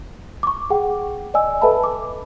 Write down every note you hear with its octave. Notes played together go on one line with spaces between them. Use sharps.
C#6 D6
G#4 F#5 G5
D5 D#5 G#5 E6
A4 B4 D#5 E5 A5 B5
D6